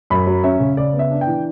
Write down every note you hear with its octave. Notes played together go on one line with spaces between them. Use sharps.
F#2 B5
F#3
C#4 E5
C#3
C#3 D5
B3
E5
D4
G5
E3